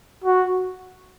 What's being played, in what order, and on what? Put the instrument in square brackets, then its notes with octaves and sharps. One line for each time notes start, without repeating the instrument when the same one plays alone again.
[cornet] F#4